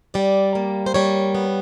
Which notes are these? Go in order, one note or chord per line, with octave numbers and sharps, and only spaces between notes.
G3 D5
A#3
C5
G3 C#5
B3